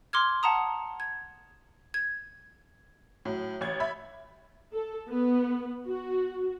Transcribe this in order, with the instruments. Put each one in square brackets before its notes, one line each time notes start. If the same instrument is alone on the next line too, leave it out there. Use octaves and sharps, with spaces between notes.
[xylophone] C6 D6 F6 G#6
F#5 A5 A#5 D#6
G#6
G#6
[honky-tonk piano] A2 F#3
A1 G#6
E5 B5
[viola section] A4
B3
F#4